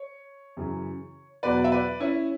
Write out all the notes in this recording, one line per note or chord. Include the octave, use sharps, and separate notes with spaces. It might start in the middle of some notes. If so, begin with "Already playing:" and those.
Already playing: C#5
F#2 C#3 E3
E2 B2 F#3 B4 D5
E5
B4 D5
C#4 E4